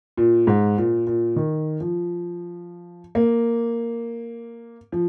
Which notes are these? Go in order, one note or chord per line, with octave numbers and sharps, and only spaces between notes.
A#2
G#2
A#2
A#2
D#3
F3
A#3
F3